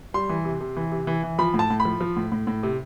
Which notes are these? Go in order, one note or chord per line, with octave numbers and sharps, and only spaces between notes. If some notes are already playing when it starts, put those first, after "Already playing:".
G3 C6
E3
C3
C3
E3
C3
E3
E3
F3 B5
A2
A5
A2
B5
F3
F3
A2
A2
A2
C3